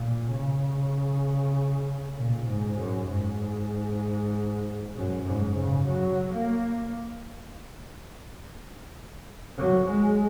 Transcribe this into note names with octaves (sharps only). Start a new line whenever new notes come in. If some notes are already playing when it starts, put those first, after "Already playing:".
Already playing: A#2
C#3
A#2
G#2
F#2
G#2
F#2
G#2
C#3
F#3
A#3
F#3
G#3